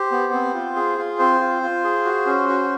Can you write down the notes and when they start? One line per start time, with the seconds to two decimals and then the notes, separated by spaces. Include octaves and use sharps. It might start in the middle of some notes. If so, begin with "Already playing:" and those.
Already playing: G4 C5
0.12 B3
0.33 C4
0.54 F4
0.76 G#4
0.98 F4
1.19 C4 C5
1.40 F4
1.63 F4
1.84 G#4
2.05 F#4
2.26 C#4
2.49 F#4